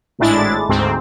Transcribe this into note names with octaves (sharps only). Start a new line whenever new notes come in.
G#1 A2 G#3 D4 E4 A6
D2 G#2 C4